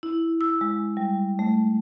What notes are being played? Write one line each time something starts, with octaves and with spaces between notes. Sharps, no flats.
E4
E6
G#3
G3
A3